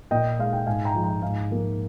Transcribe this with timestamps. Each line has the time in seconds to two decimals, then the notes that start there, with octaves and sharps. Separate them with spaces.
0.11 A#2 D#5 G5
0.39 G#3 F5
0.53 G5
0.67 G#2 F5 G#5
0.85 G5 A#5
0.94 F3 G#3
1.04 G5 A#5
1.22 G#2 F5 G#5
1.50 F3 A#3